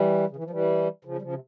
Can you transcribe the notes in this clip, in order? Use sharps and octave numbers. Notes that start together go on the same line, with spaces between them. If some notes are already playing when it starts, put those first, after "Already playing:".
Already playing: E3 G3
C#3
E3
F3
E3 G3
C#3 F3
G3
C#3 F3
C3